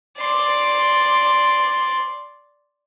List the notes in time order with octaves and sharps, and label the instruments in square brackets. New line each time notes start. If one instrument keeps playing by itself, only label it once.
[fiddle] D5 C6